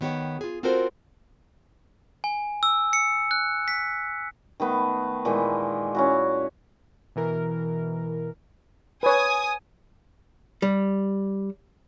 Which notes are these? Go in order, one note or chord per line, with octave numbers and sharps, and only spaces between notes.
D#3 B3 G4 C#5
F4 G#4
C4 F4 F#4 A4 A#4 C5
G#5
E6
C#7
F#6
B6
D#3 A3 B3
A#2 D#3 E3 G#3
C#4 E4 F#4
B2 E3 A#4
B4 C#5 G#5 D#6
G3